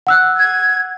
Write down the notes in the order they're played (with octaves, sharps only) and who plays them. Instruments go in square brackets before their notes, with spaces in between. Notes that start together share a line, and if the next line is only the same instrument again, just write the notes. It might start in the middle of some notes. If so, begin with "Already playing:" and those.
[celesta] F#5 E6 F#6
[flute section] G#6